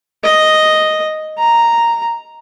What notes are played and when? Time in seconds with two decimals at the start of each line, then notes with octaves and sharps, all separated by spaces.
0.24 D#5
1.38 A#5